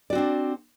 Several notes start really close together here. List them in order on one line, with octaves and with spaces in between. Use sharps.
D5 F#4 C4 D4